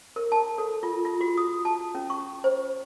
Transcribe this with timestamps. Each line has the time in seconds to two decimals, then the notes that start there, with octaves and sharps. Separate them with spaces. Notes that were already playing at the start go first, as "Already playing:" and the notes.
0.16 A#4
0.32 A5
0.58 A4
0.83 F4
1.05 F4
1.21 F#4
1.38 D#6
1.65 A5
1.95 C#4
2.10 C#6
2.44 C5